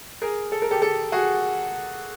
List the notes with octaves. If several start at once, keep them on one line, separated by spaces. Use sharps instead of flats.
G#4 A#4
A4
A#4
G4 A4
G4 A4
F#4 G#4